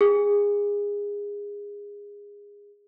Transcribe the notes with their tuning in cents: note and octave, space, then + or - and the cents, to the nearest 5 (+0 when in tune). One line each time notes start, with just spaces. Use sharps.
G#4 -25